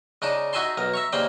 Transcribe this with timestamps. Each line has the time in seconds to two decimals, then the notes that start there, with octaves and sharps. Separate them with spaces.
0.22 C#3 D4 D#4 A5 D6
0.53 D#4 F#4 E5 G#5 A5 C6
0.77 B1 A#4
0.94 E5 A#5 C#6
1.13 D#2 C#3 A#3 C5 D5 G5